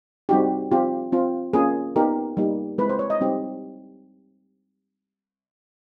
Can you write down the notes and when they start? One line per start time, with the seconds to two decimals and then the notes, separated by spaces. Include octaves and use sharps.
0.29 G3 C4 D#4 F#4 G4
0.71 C4 F4 G4
1.12 C4 F4
1.53 A#3 C#4 F4 G#4
1.96 B3 D#4 G4 A#4
2.37 G3 A#3 D#4 G4
2.78 G#3 C4 E4 B4
2.89 C5
2.99 C#5
3.10 D#5
3.21 G3 C4 D#4 G4